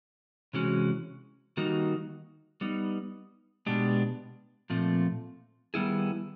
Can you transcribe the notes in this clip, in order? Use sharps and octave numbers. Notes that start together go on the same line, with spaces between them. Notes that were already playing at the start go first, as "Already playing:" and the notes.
C3 E3 G#3 C#4 F#4
D#3 G3 A#3 D#4 F#4
G3 B3 D#4
B2 G#3 B3 D4 G4
A#2 F3 A3 C4
D#3 G3 B3 E4 G#4